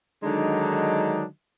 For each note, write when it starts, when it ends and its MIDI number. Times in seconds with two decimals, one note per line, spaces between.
0.23 1.24 50
0.23 1.24 51
0.23 1.24 54
0.23 1.24 56
0.23 1.24 62
0.23 1.24 63